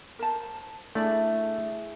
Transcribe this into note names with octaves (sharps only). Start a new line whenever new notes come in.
A#4 C5 A5
A3 D4 E4 G#4 D5